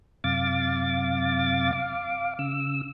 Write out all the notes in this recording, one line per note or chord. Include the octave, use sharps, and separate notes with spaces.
F#2 C3 F5 D6 A6
F5 D6
C#3 E6